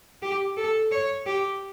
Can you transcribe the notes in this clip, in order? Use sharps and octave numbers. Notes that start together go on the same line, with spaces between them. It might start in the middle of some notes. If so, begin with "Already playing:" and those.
G4
A4
C#5
G4